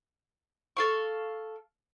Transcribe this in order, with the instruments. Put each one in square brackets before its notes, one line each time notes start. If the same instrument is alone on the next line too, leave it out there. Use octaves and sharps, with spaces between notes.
[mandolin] A4 F5 C#6